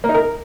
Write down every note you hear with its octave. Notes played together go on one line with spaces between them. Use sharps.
A#3
D#4
A#4